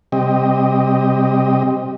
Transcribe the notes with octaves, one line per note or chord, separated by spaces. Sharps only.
C3 G3 C4 G4 D#5